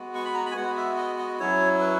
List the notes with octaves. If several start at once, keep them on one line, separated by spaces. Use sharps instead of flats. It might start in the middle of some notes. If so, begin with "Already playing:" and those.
Already playing: G#3 B3 F#4
C#6
B5
A#5
B5
G#5
G#3 B3 F#4 F#5
E5
D#5
D#5
F#3 C#4 E4 C#5
B4